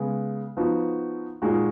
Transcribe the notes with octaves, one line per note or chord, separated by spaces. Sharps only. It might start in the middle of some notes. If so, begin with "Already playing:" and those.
Already playing: C#3 G#3 B3
F3 B3 D#4 F#4
A#2 G#3 D#4 F#4